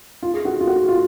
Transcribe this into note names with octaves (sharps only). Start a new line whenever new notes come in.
F4
G#4
F#4
F4
F#4
F4